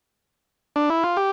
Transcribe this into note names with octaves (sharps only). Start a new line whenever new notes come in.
D4
E4
F4
G4